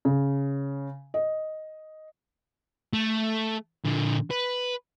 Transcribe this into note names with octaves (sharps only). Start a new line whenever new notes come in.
C#3
D#5
A3
A#2 D3
B4